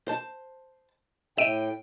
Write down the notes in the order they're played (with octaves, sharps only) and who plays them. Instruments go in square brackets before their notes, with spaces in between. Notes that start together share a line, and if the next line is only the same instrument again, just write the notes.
[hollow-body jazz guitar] C5 A5
[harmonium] A2 G5 [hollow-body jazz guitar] E5 [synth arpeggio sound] D7 D#7